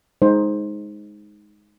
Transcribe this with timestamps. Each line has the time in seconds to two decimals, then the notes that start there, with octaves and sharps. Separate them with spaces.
0.22 G#3 D#4 C5